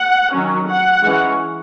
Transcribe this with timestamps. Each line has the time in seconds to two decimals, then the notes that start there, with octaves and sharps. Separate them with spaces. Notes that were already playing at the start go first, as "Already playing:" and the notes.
Already playing: F#5
0.33 D#3 F#3 C#4
0.68 F#5
1.03 E3 G#3 C#4